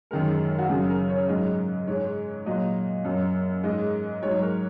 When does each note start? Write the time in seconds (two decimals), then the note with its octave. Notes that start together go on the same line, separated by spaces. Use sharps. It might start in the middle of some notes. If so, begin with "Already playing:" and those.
0.11 F#2 D#3 G#3 A#4
0.59 F#4
0.69 F#2 C#3 F#3 G#4
0.89 A#4
1.09 C#5
1.28 G#2 F#3 D#5
1.87 G#2 G#3 C#5
2.46 A#2 F#3 D#5
3.05 F#2 F#3
3.64 G#2 G#3 D#5
4.23 G#2 F#3 C#5
4.43 A#4